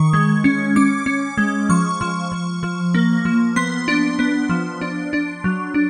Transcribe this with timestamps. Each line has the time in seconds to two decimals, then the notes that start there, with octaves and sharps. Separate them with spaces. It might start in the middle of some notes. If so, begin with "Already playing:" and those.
Already playing: D#3 C#6
0.13 G#3
0.44 C#4
0.76 C#4 D6
1.06 C#4
1.37 G#3
1.69 F3 C#6
2.01 F3
2.32 F3
2.63 F3
2.94 A#3
3.25 F3
3.56 B3 C6
3.88 D4
4.19 B3
4.49 F3
4.81 D4
5.13 D4
5.44 F#3
5.74 D4